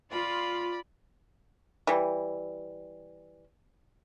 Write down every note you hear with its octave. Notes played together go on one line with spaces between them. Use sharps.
F4 D5 B5
E3 G3